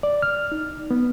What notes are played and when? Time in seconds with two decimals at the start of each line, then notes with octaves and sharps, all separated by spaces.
0.03 D5
0.22 F6
0.52 D#4
0.91 B3